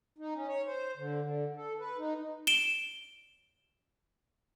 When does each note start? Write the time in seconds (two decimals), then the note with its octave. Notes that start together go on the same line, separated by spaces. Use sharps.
0.18 D#4
0.34 C#4
0.48 C#5
0.66 C5
0.97 D3
1.22 D3
1.56 A4
1.79 B4
1.98 D#4
2.47 D7 E7 G7